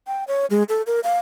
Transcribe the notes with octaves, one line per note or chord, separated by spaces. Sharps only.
G5
C#5
G#3
A4
A#4
F5